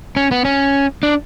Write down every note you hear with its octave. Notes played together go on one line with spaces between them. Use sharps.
C#4
B3
C#4
D4